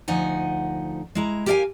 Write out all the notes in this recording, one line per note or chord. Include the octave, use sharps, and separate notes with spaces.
D2 F3 D#4 F#5 G#5
G#3 E4 A#5
G4 A#4 D5 E5 F5 G#5